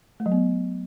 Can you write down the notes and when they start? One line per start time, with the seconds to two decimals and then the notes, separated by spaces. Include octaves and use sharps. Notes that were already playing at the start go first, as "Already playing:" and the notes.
0.20 A3
0.26 F#3
0.32 B3